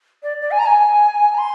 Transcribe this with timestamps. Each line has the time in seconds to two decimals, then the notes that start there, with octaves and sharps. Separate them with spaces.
0.23 D5
0.41 D5
0.51 G#5
0.59 A#5
0.66 G#5
1.34 A#5
1.38 C6